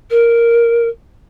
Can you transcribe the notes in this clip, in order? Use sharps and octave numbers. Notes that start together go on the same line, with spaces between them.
A#4